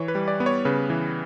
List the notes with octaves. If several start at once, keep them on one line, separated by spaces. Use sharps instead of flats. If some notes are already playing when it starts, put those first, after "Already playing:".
Already playing: E3 C#5
B4
G3
D5
B3
C#5
C#3 B4
E3